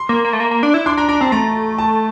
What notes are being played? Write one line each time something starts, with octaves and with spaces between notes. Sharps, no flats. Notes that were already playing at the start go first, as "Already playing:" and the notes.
Already playing: C6
A#3
A#3
A3
A#3
A#3
D4
E4
D4 C6
D4 A#5
D4 A#5
C4 A5
A3 A#5
A5